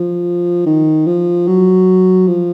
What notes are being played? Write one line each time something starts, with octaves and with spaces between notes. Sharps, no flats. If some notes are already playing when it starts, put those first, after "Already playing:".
Already playing: F3
D#3
F3
F#3
F3